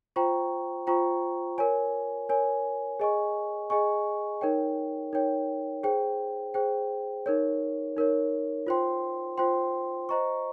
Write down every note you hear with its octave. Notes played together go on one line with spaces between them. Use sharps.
F4 C5 G5 A#5 C#6
F4 C5 G5 A#5 C#6
A#4 C#5 G#5
A#4 C#5 G#5
G#4 D#5 G#5 C#6
G#4 D#5 G#5 C#6
D#4 A#4 C#5 G5
D#4 A#4 C#5 G5
G#4 C5 G5
G#4 C5 G5
D#4 A#4 C#5
D#4 A#4 C#5
F4 C5 G5 C6
F4 C5 G5 C6
C5 D#5 A#5 C#6